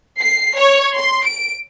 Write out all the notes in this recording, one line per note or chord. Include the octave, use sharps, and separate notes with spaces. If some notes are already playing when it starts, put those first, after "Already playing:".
C7
C#5
C6
D7